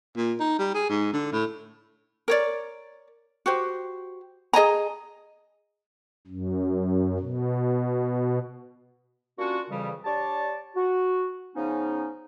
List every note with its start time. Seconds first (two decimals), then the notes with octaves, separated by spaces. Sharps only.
0.17 A#2
0.40 D#4
0.59 G3
0.75 G#4
0.89 G#2
1.13 D3
1.32 A2
2.28 A#4 C#5 D5
3.46 F#4 G4 C5
4.53 G#4 D#5 G#5 A#5
6.27 F#2
7.20 B2
9.39 G3 A#3 C#4 D4 F4 F#4
9.70 F2 C#3 E3 G3
10.05 D4 G4 C#5 D5 A5
10.75 F#4
11.55 C#3 F3 B3 C#4 D#4